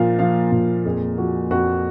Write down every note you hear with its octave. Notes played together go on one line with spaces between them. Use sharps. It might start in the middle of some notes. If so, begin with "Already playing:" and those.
Already playing: A#2 F3 F5
F3 F5
A#2
F2 G#4
F3 F#4
F2 F#4